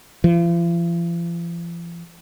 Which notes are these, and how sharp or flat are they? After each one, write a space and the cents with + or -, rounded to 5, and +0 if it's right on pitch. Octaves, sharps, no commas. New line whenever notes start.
F3 -45